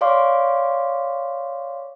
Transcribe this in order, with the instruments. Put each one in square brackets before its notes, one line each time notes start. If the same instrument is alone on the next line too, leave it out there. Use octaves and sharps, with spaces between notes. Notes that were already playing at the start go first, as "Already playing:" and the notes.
[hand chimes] C#5 D5 F5 C6 D6